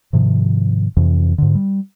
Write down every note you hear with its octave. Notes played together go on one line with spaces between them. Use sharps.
G#2 C3 D#3 F3
F2 C3 E3
G#2 D3
G3